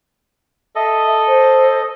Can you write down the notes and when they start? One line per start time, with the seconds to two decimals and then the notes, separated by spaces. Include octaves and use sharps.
0.75 A4 D#5 E5
1.27 C5